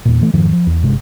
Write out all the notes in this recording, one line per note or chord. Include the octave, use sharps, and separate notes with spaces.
E2 A#2
E3 A3
F2 G#2 D#3 F3
F3
E2
G1 C3 G#3